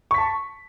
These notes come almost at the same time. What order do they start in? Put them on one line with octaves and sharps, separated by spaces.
C#6 B6 A5